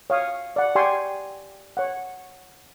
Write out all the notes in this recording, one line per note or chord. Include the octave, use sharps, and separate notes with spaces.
C#5 F5 D#6
D5 F#5
G4 D5 G5 G#5 C6 C#6
C#5 F#5